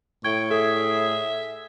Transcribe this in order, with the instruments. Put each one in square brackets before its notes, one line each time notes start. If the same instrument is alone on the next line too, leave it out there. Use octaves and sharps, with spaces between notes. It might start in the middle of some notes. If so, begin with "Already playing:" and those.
[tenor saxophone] A2 [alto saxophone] G5 [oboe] C#6 [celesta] G#6
[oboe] G#4 [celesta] A4 [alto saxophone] E5